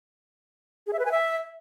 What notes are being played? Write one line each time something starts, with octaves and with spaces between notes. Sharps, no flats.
G#4
E5
B4
G#5
E5